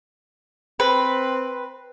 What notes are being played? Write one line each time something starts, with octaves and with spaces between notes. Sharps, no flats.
C4 B4